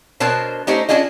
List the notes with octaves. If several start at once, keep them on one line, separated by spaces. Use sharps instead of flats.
B2 D4 A#4 C5 C#5 A5
A3 C#4 D#4 G4 C5 C#5
C#4 D4 F4 G#4 D#5